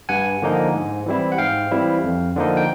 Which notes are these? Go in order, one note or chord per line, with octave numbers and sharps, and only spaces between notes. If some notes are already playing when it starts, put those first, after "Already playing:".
G2 F#5 G#5
D3 F3 A#3 D#4
G#2
E3 G3 C4 E4
F#5
G#2 F5 G5
E3 G3 C4 E4
F2
D3 F3 A#3 D#4
G5